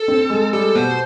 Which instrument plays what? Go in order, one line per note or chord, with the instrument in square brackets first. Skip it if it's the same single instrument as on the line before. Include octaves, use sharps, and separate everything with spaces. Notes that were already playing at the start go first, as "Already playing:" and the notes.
Already playing: [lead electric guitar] A4
[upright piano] C4
G#3
[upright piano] G3 [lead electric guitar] A4
[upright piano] B2 [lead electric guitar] C5